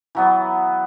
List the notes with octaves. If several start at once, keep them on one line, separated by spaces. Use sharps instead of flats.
E3 F#3 B3